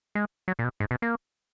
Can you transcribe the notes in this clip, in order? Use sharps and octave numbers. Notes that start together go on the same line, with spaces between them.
G#3
F#3
A#2
B2
G#2
B2
A#3